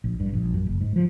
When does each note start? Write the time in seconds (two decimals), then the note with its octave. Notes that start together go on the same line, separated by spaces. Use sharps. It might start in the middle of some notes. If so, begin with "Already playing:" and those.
0.04 A#1
0.20 G2
0.33 A#1
0.54 F#2
0.66 F#1
0.81 G#2
0.96 F3